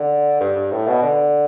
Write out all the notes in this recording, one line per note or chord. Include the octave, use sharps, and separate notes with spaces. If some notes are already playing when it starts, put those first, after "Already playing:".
Already playing: D3
G2
G2
A2
B2
D3